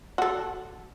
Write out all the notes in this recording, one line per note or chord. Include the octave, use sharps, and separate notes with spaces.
F#4 A4